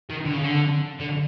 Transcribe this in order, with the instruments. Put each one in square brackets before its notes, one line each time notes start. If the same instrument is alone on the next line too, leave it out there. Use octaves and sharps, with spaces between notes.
[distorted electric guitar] D#3
D3
C#3
D3
D3